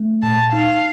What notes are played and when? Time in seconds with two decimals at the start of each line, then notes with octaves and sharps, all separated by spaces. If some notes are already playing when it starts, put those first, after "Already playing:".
Already playing: A3
0.23 A#2 A5
0.52 D#4 F5